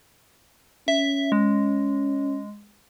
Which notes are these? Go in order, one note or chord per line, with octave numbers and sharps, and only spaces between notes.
C#4 E5
G#3